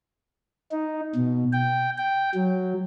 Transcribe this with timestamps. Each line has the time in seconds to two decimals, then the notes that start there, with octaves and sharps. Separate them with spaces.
0.72 D#4
1.15 B2
1.53 G5
1.98 G5
2.34 F#3